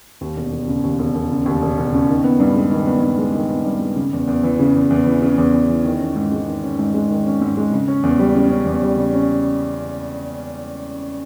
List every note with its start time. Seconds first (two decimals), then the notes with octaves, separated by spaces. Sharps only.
0.21 D#2
0.36 E1
0.52 E1
0.68 C#3
0.83 D#2
0.99 E1
1.15 E1
1.30 C#3
1.46 D#2
1.62 E1
1.78 E1
1.92 C#3
2.09 D#3
2.24 B3
2.40 G2
2.55 G#3
2.71 D#3
2.87 B3
3.02 G2
3.18 G#3
3.34 D#3
3.50 B3
3.65 G2
3.81 G#3
3.96 C#3
4.13 E2
4.27 E2
4.43 E3
4.59 C#3
4.75 E2
4.90 E2
5.06 E3
5.22 C#3
5.38 E2
5.53 E2
5.69 E3
5.85 D#3
6.00 C#4
6.16 G#2
6.32 G#3
6.48 D#3
6.63 C#4
6.79 G#2
6.94 G#3
7.10 D#3
7.26 C#4
7.41 G#2
7.57 G#3
7.72 C#3
7.88 C#4
8.03 E2
8.19 G3
8.35 C#3
8.51 C#4
8.66 E2
8.82 G3
8.97 C#3
9.14 C#4